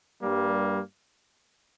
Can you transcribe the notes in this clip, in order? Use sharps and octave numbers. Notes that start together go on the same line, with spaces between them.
G2 G3 A#3